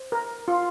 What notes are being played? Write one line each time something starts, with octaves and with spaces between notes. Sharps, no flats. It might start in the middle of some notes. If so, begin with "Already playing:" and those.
Already playing: C5
A#4
F4